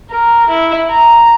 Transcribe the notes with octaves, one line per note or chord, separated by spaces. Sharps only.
A#4
E4
A#5